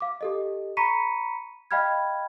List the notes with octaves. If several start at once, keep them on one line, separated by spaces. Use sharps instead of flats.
F5 D6
G4 A4 D#5
A#5 B5 C#6 B6 C#7 D#7
D#5 F5 G5 B5 F6 G#6